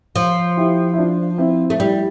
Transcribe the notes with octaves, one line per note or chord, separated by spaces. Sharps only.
F3
E4 G4
E4
D4 F4
C4 E4
A3
G3 E4 G4